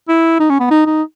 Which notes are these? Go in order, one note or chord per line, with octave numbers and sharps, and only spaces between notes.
E4
D#4
C#4
B3
D#4
D#4